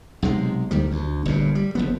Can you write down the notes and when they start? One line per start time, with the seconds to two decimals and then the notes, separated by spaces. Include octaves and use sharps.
0.22 B1 C3 G#3
0.71 D2 D#3 G3
0.91 D2
1.26 G1 G2 A#2
1.55 G3
1.75 F#1 F3 B3